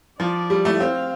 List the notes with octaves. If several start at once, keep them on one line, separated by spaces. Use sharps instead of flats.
F3 D5
G3
A3
C4 F5